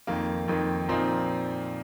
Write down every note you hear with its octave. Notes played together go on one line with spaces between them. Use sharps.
F2 D#3 A#3
F2 D#3 A#3
A#2 F3 C4 D#4